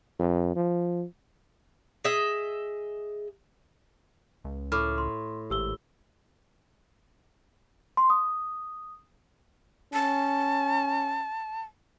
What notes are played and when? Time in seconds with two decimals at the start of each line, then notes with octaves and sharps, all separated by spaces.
0.19 F2
0.55 F3
2.05 G#4 D#5 E5
4.44 C#2
4.72 A2 D6 F6
4.98 C6
5.50 G#1 G4 E6 G7
7.97 C6
8.10 D#6
9.93 C#4 A5